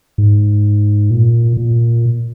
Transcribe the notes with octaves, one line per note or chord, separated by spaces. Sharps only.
G#2
A#2
A#2